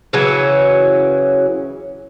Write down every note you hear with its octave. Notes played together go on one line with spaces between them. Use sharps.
C#3 E3 F#3 C#4